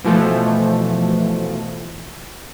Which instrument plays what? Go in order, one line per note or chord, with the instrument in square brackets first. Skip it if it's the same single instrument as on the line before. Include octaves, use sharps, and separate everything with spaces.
[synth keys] B2 E3 F3 A3